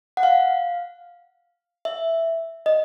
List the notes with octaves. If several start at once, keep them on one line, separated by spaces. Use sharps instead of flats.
F#5
F5
E5
D#5